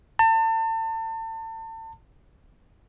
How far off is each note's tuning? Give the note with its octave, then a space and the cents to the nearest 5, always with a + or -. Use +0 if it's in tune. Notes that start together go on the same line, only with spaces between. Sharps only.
A5 +35